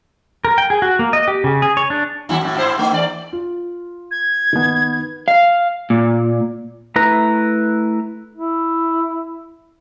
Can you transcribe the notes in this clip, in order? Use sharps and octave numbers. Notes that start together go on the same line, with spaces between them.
A#4
G5
G#4
F#4
A#3
D#5
G4
C#3
G#4
C#5
D4
D#2 F#3 E4
F#2 A2
G#2 E4 C5
A3 D#4
E2 D5
F4
G#6
D#3 B3
F5
A#2
A3 E4 B4 A#5
E4